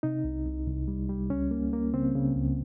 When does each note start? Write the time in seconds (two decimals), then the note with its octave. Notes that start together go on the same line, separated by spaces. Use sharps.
0.03 C3 D#4
0.24 C2
0.46 C2
0.67 C2
0.88 G3
1.09 G3
1.30 C#2 C#4
1.51 A#3
1.73 A#3
1.94 C#3 C4
2.15 C#3
2.37 C#2